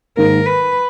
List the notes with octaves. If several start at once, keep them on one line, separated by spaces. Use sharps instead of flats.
G#2 D#3 A#3 A#4
B4